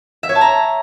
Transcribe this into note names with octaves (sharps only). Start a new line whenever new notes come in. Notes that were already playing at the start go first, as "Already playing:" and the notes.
E5
C#5
A5
A#5